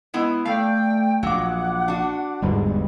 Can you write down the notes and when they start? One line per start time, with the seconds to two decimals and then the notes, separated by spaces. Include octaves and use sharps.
0.14 G#3 B3 E4
0.45 A3 D5 F5 G5
1.23 A#1 F#3 F#5 D6 F#6
1.88 D4 F#4
2.42 G1 E2 G#2 G3 G#3